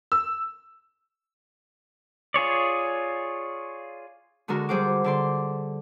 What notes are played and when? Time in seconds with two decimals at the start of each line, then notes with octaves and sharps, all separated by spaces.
0.12 E6
2.34 F4 G#4 C#5 D5
4.48 D3 G#3 D4 F#4 A#4
4.69 D3 G3 G#4 C5 F#5 D6
5.04 D3 D5 C6